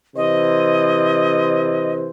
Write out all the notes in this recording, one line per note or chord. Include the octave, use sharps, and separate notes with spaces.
C3 E3 C5 D#5